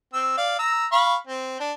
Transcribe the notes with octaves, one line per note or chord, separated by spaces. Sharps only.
C4 E6
D5 F5
A#5 E6
F5 B5 C#6
C4
D4